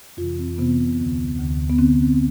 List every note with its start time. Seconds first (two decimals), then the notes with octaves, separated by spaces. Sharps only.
0.17 F2 C3 E3 F4
0.39 C4
0.58 F2 C3 E3 B3
0.98 D2 D3
1.39 D2 D3
1.69 B3
1.79 D3 C4